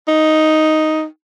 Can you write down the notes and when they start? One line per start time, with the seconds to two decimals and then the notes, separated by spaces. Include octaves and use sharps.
0.08 D#4